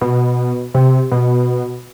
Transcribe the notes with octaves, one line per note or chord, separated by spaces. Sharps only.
B2
C3
B2